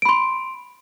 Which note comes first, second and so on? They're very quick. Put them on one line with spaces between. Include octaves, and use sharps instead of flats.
D7 B5 C6